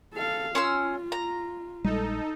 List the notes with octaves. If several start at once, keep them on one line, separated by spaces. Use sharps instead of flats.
A4 F5
C#4 F4 C6 E6
A#5
A#1 G3 G#3 D#4 A4